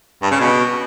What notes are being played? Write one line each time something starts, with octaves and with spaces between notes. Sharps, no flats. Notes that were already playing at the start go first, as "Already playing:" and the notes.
G2
C#3
B2